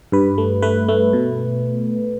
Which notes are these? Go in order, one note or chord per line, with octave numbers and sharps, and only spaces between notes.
G2 B4
A3
A3 B4
A3
B2